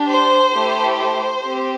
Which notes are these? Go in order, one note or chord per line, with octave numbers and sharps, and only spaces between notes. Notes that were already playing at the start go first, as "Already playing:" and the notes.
Already playing: D4 G4
C5
A3 E4 G4
C5
C4 G4